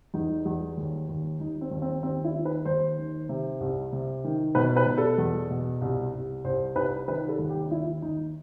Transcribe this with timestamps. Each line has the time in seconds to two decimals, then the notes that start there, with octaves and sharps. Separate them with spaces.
0.14 E2 D#4
0.45 E2
0.77 D#2
1.09 D#2
1.40 D#2 D#4
1.61 C4
1.71 D#2
1.82 C4
2.03 D#2 C4
2.24 E4
2.35 D#3
2.45 B4
2.65 D#2 C5
2.98 D#3
3.29 C3
3.61 C2
3.92 C3
4.24 D#3
4.55 B2 B4
4.76 B4
4.86 B2
4.98 A4
5.18 E2
5.50 B2
5.81 C2
6.13 C2
6.44 C2 C5
6.76 C2 B4
7.08 D#3 B4
7.28 A4
7.39 D#2
7.50 G4
7.66 D#4
7.71 D#2 E4
8.02 D#2 D#4